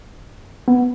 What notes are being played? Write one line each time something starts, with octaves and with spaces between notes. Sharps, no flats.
B3